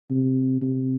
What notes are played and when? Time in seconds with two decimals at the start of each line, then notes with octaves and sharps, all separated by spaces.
0.11 C3
0.61 C3